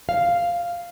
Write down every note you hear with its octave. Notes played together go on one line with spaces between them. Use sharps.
F5